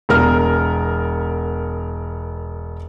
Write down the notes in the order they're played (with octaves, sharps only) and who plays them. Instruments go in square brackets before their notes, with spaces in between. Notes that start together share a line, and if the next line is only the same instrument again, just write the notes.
[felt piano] E1 B3 A#4 F6